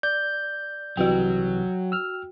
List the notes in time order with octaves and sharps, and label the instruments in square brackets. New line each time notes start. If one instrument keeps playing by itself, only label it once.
[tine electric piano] D5 [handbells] G6
[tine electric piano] C2 C3 E3 [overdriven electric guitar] F#3 [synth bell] F#4 G5
[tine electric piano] E6 F6